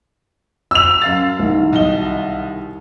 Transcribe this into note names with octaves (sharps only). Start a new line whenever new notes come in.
E6 F7
F#2 F5 A6
C2 D#3
B1 D#5 G7